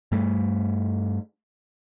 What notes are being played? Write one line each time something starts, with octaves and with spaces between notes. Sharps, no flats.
G2 G3 A3